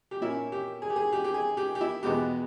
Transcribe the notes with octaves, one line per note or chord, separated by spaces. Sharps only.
G4
A#2 A#3 C#4 E4
G4
G#4
G4
G#4
G4
G4
G#4
G4
G4
E4
E2 B2 G#3 B3 G4